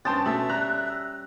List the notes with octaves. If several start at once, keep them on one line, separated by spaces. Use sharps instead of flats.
G2 C#4 C5 G5 A5 C6 D#6 A6
B2 A3 C#5 E5 G#5 B5
G3 A#5 F#6